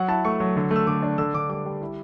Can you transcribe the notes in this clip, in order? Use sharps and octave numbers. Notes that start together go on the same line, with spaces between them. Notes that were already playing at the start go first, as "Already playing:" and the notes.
Already playing: F#3 F#5
E4 A5
A3 C#6
F#3
D3
A3 E6
D3 D6
D4
D3 E6
D3 D6
G3 D6
G3
E4